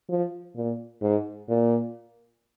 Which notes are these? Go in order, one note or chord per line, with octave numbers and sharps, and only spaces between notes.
F3
A#2
G#2
A#2